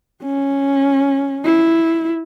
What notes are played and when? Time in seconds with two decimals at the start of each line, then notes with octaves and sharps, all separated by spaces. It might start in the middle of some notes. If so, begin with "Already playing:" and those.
0.23 C#4
1.45 E4